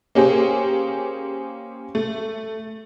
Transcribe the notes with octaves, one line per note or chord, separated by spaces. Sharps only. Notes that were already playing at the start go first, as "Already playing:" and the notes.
A#3 C#4 G4 G#4 C5
A3